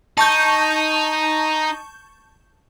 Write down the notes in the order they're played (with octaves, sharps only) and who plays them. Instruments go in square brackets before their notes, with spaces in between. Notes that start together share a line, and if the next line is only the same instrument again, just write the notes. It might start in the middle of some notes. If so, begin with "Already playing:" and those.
[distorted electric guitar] D#4 [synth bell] A5 C#6 G6